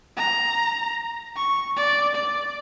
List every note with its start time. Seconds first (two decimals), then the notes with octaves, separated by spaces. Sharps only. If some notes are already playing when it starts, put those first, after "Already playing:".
0.17 A#5
1.36 C#6
1.76 D5
2.15 D5